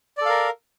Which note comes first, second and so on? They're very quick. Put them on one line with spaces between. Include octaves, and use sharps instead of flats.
D5 A4 F5 A#4